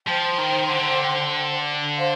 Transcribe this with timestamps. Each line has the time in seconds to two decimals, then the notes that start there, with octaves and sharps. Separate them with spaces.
0.07 F3 C5 G5 C6
0.38 D#3
0.69 D3
1.97 C5 F5 C6